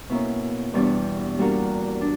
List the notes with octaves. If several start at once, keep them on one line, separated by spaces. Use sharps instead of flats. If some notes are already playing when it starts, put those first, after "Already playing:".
B2 A#3 C#4 E4
E2 B2 G3 B3 D4
G3 A#3 D4 F#4 A#4
D4